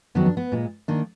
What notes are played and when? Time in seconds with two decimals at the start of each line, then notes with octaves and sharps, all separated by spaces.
0.15 F2 D#3 F#3 B3
0.26 D4
0.37 B3
0.52 A#2 G#3
0.88 D#3 A#3 D4